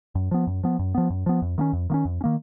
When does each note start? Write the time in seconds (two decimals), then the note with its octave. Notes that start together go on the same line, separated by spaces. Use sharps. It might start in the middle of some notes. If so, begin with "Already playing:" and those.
0.15 F#2
0.31 F3 B3
0.47 F#2
0.64 F3 B3
0.79 F#2
0.95 F3 B3
1.10 F#2
1.26 F3 B3
1.42 F2
1.58 D#3 A#3 C#4
1.73 F2
1.90 D#3 A#3
1.94 C#4
2.05 F2
2.21 C#4
2.24 D#3 A#3